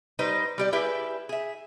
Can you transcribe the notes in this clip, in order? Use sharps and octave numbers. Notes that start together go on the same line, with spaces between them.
G3 D#4 B4 C5 D#5
G3 G4 D5
E4 G4 G#4 B4 E5
G#4 E5